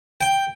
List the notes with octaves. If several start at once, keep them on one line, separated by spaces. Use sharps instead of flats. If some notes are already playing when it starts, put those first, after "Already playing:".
G5